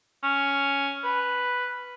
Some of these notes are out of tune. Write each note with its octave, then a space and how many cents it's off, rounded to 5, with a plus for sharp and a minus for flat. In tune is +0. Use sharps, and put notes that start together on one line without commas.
C#4 +5
B4 +0